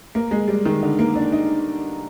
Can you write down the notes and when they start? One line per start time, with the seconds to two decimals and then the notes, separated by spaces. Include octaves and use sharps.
0.15 A#3
0.31 G#3
0.48 G3
0.65 D#3
0.83 D3
0.99 A#3
1.15 D4
1.32 D#4